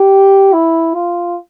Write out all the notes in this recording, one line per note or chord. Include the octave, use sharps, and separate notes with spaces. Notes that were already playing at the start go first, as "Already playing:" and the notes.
Already playing: G4
E4
F4